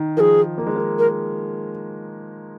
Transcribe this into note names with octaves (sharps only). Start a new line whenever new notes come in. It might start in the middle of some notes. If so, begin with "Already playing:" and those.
Already playing: D#3
F3 G#4 A#4
A#3
G#3
A#3
A#4